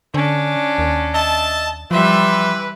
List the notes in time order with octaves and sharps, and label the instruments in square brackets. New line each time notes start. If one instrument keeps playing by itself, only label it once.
[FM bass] D3 [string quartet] C#4 D4
[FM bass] D#2
[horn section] D#5 E5 A5
[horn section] E3 B4 [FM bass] F3 [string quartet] G3 E5 C6